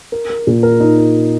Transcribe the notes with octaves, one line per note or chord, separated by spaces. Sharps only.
A#4
A#4
A#2
A#4
D#4
A#4